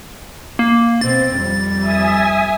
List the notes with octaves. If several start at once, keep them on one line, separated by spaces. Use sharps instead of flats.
A#3
B2 C4 A6
F2 G3
E5 G#5 D#6